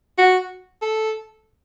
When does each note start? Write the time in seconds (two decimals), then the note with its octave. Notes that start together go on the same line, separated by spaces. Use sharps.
0.18 F#4
0.82 A4